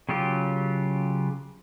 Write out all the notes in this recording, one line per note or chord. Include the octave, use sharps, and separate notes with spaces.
C#3 F#3 F4 G4